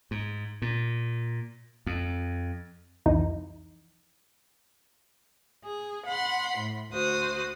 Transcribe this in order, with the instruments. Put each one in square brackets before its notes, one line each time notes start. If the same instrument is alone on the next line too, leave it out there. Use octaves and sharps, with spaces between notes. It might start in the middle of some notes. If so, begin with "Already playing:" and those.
[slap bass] G#2
A#2
F2
[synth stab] C2 F2 E3 D#4
[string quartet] G#4
F#5 B5 C6
A2
D2 F#4 C5 D#6